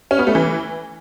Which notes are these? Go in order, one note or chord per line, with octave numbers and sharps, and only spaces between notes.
C#4
B3
A3
E3